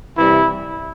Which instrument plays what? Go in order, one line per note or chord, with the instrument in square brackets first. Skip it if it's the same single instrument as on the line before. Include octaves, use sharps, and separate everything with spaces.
[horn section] C3 E3 G3 E4